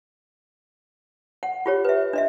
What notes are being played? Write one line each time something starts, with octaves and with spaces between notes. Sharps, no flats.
F#5
F4 G4 C#5
B4 E5
D4 D#5 E5